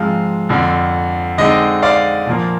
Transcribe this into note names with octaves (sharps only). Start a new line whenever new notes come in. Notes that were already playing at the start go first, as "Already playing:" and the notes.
Already playing: G#2 F3 G#3 C4 F5
F2 D3 F3
D3 G#3 C4 D#4 D#5
D5 F5
A#2 F3 A#3